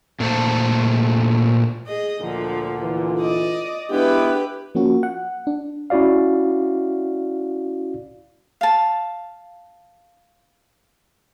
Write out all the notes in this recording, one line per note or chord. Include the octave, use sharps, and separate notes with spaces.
A#2 A3 A4 C5
G#4 D#5
D2 A#2 D3 F3
E3 F4
D5 D#5
G#3 B3 D4 E4 G4 B4
F3 A#3 C#4 F#4
F#5
D4
C#4 E4 F#4 D5 F5
F5 A5